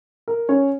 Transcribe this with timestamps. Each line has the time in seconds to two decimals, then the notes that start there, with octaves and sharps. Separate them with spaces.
0.28 A#4
0.49 C#4 C#5